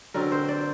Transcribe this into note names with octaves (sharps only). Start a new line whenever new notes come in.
D3 F#3 C4 A#4
C5
D5